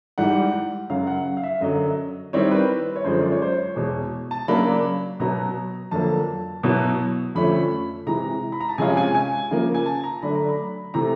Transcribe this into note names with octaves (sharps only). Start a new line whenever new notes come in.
G#2 E3 G3 F#5
F#2 C#3 F#3 F5
F#5
F5
E5
F#2 D3 F#3 D#5
D#3 G3 C4 E4 C#5
B4
C#5
F#2 D3 F3 G#3 C#4 C5
D5
C#5
C5
C#5
E2 B2 G#3
A5
C#3 F#3 A#3 D4 B5
B2 F#3 B3 A#5
F2 D3 F#3 A#3 A5
B2 F#3 B3 E4
F2 D3 F3 A3 C#4 B5
C3 E3 G#3 A#5
B5
A#5
A5
C3 F3 G#3 C#4 F4 G#5
G#5
G#5
C#3 F3 A#3
G#5
A5
A#5
D3 F#3 A3 D4 B5
A#5
B5
C3 E3 A3 A#5